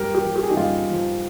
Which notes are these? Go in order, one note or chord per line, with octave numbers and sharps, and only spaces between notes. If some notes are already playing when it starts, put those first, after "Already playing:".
Already playing: G2 G4 A#4
G4 A#4
F3
G4
G#4
D#4 G4
G2 F4 G#4
F3